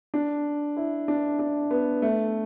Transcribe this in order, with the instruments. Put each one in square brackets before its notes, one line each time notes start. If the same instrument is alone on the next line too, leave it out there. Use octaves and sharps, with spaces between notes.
[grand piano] D4
E4
D4
D4
B3
A3